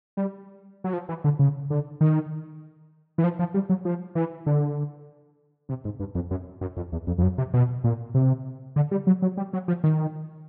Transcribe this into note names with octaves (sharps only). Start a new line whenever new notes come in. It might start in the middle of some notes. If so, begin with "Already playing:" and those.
G3
F#3
F3
E3
D3
C#3
D3
D#3
E3
F3
F3
G3
F#3
F3
E3
D3
C3
G#2
G2
F2
F#2
F#2
F2
E2
F2
F2
F#2
C3
B2
A#2
C3
D3
G3
F#3
F#3
G3
F#3
F3
D#3